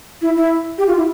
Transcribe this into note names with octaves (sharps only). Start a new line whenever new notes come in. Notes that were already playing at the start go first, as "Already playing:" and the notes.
E4
E4
G4
F4
E4